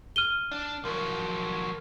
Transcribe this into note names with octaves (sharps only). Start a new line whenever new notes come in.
F6 D#7 G7
D4
D#3 F3 F#3 A#4